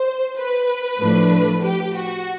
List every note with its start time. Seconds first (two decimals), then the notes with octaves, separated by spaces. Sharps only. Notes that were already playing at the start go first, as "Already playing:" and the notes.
Already playing: C5
0.37 B4
0.99 A2 F3 A3 D4
1.62 G4
1.94 F#4